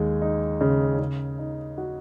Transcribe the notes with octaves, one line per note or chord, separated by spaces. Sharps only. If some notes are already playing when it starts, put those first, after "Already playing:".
Already playing: D#2 G#3
D#4
C#3
C#3
D#4
F#4